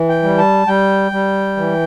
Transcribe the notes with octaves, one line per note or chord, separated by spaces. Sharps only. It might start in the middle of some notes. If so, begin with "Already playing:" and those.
Already playing: E3
G5
G3
A5
G3 G5
G3
E3